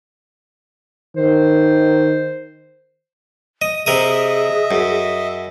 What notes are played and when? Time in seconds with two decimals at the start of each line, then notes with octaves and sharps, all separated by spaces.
1.17 D#3 C5
3.62 D#5
3.86 C3 G#4 A#4 D#5 E5 D#6
4.71 F#2